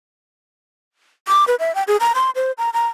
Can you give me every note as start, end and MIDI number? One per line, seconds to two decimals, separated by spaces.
1.28 1.44 86
1.48 1.55 71
1.59 1.74 76
1.75 1.83 79
1.88 1.97 68
2.00 2.12 82
2.15 2.30 84
2.36 2.52 72
2.58 2.70 82
2.73 2.87 82